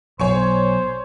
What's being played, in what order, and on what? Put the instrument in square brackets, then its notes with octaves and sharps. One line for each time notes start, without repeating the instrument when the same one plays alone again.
[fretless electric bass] B1 [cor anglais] C5 [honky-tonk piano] C#5 G#5 C#6